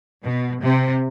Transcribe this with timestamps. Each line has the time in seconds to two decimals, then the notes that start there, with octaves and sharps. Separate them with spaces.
0.24 B2
0.63 C3